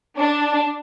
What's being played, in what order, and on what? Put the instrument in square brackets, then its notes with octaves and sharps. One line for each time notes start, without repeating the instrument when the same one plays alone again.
[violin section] D4